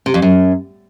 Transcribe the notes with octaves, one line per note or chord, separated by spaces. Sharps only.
C3
F2
F#2